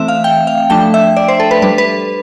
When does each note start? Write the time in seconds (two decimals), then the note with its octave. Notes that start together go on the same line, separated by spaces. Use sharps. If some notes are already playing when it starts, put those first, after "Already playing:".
Already playing: E3 A3 C4 E5
0.08 F5
0.24 G5
0.47 F5
0.70 F3 A3 D4 G5
0.94 E5
1.17 D5
1.28 C5
1.40 A4
1.51 B4
1.62 G3 D4 B4
1.78 B4